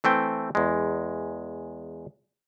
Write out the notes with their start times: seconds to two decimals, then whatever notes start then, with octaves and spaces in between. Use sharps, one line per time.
0.04 E3 A3 C4 G5
0.55 E2 G#3